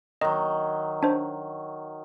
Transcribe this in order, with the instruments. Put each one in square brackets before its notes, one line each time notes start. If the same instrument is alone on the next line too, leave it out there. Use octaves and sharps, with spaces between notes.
[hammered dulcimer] D#3 F#3 [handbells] D#5
[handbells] D4 C5